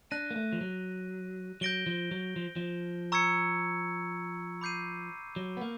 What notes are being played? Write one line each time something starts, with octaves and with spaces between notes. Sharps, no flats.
D4 F#6 A#6 D#7
A#3
A3
F3
F#3
F#3 G6 A#6 D7 G7
F3
F#3
F3
F3
A#5 C#6 E6 G#6 C#7
B5 D6 G6 C7 D#7
F#3
B3
A#3